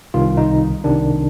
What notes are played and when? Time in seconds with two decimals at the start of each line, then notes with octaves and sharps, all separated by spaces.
0.14 C2 C3 D#3 F4
0.37 D#4
0.84 C2 C3 D#3 D4